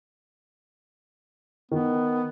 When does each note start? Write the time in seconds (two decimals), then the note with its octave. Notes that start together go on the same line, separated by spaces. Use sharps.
1.72 D#3 B3